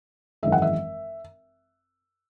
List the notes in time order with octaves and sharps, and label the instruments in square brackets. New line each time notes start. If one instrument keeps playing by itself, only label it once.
[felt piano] G#1 F#2 E3 G#3 E5
F#5
E5